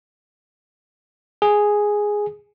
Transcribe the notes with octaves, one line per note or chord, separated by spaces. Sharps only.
G#4